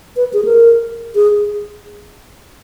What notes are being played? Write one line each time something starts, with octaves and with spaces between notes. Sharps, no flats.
B4
G#4
A#4
G#4